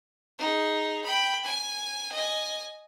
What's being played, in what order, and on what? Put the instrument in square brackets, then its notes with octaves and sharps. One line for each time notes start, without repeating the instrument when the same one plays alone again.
[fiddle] D#4 G#4
G5 B5
G#5
D#5 G#5